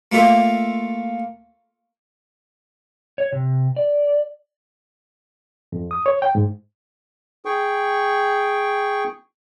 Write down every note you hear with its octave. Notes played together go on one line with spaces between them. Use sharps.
A3 A#3 F4 E5
C#5
C3
D5
F2
D#6
C#5
G5
G#2
G#4 G5 C#6